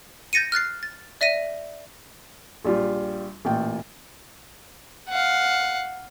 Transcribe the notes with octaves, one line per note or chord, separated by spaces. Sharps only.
G6 A6 A#6 C#7 D#7
F6 F#6 A6 C7
A6
D5 E5 A#6 D#7
A#1 G3 F4
A1 A#2 G5
F5 F#5